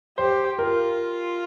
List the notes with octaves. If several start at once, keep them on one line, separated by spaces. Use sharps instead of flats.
G4 C5
F4 A#4